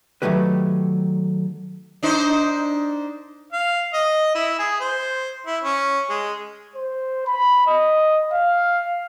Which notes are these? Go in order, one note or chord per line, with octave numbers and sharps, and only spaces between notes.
D#3 E3 F#3 A3 G4 B4
D4 D#4 C5
F5
D#5
E4
G#4
C5
E4
C#4
G#3
C5
B5
D#5
F5